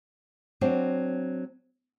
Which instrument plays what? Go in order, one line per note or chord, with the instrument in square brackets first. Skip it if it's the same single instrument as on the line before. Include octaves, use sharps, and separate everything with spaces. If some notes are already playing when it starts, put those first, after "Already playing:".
[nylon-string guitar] F#3 C4 D4